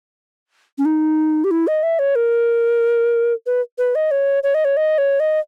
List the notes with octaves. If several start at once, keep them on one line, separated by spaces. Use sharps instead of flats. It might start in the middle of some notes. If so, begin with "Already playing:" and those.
C#4
D#4
G4
E4
D#5
E5
C#5
A#4
B4
B4
D#5
C#5
C#5
D#5
C#5
D#5
C#5
D#5